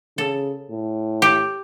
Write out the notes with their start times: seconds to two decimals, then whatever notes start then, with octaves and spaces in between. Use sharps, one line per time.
0.18 C#3 A4
0.70 A2
1.22 G4